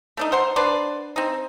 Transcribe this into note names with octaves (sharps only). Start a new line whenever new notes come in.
A3 D4 D#4
C5 F#5 A#5 C6
D4 B4 C5 D5
C4 D#4